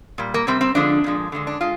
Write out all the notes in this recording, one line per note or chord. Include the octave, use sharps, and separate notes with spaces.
A#2 G3
A#3
C3 G3 C4
C4
D3 F3 G#3 D4
A#2 F3 G#3
D3 F3 G#3
D4
G#3 F4